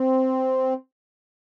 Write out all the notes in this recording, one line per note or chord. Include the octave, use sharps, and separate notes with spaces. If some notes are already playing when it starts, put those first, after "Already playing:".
Already playing: C4